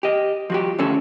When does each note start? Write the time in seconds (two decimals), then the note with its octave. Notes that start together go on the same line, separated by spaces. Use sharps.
0.03 G4 D#5
0.50 F3 F#4 G4
0.79 D2 F3 C#4 A4